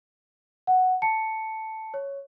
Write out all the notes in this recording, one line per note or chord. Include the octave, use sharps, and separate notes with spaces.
F#5
A5 C#7
C#5